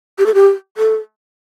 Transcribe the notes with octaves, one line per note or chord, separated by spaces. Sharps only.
G4
A4
G4
A4